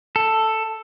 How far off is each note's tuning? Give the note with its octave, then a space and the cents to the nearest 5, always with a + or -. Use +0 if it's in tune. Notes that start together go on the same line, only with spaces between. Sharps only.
A4 +5